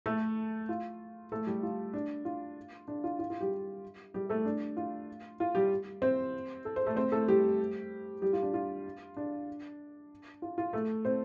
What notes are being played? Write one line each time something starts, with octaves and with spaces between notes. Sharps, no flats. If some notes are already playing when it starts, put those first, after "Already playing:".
A3 A4
F4
A3 A4
G3 G4
F4
D4
F4
D4
F4
F4
F4
G3 G4
G3 G4
A3 A4
D4
F4
F4
G3 G4
C4 C5
A4
C5
A3 A4
C4 C5
A3 A4
G3 G4
G3 G4
F4
D4
F4
D4
F4
F4
A3 A4
C4 C5